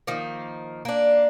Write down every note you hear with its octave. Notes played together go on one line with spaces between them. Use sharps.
D#3 F3 A#3
A#3 D4